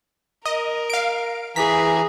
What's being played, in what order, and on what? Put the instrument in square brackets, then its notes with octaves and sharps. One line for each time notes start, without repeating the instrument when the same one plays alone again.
[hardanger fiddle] A#4 [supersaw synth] D#5
[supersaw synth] F5 D7
[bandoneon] E3 A#5 [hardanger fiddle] G#4 [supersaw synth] B6